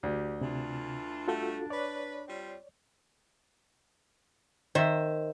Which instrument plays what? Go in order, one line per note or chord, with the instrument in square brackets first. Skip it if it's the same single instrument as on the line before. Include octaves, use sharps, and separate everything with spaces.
[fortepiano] D2 [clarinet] G4
[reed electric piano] C3 [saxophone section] E3 A3 F4 [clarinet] D4
[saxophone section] G3 A3 [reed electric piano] F4 F#4 A4
[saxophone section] B4 [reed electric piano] C#5 D5
[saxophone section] G3 C4 F4
[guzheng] D#3 [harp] C5 E5